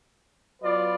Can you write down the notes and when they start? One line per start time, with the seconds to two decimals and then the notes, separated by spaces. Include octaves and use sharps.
0.62 F#3 B3 F4 B4 D5